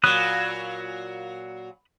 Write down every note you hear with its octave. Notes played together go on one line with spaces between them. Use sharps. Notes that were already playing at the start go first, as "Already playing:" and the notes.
A#2 F#3 B5 D#6 F#6